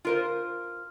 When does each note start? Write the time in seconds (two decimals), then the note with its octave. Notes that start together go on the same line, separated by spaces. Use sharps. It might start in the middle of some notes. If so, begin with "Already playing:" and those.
0.05 F4 A#4 C5